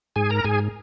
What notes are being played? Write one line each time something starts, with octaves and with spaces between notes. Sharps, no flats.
G#2 G#4 G#5
A#4 A#5
G#2 G#4 G#5